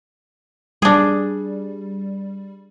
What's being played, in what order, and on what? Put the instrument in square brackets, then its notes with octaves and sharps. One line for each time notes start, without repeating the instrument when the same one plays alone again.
[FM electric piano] G3 [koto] D4 G#4